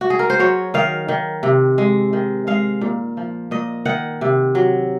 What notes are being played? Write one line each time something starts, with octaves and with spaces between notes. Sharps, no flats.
F#4
G#4
A#4
C5
F#3 C#5
D#3 F5
D#3
C3
G#3
D#3
G#3 F5
A#2
F3
A#2 D#5
D#3 F#5
C3
F#3